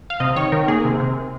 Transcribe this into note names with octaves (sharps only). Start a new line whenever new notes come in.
F5
C3 D#5
D#3 C#5
D#3 A#4
A#3 G#4
C3
C3